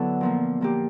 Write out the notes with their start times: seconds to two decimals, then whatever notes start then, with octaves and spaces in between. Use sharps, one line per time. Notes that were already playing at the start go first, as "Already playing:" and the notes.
Already playing: D3 F#3 B3 E4 A4
0.21 A#2 F3 A#3
0.61 A#2 F3 A#3 G4